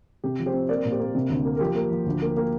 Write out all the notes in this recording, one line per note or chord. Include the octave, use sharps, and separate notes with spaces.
C3 G4
F3
G4 C5
C4
A#3 A#4 D5
A#2
G4 C5
A#3
C3
D2
A#3
A#4
F3 G4
A#3
F3
D2
A#3
A#3